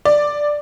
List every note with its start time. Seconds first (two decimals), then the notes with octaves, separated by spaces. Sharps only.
0.05 D5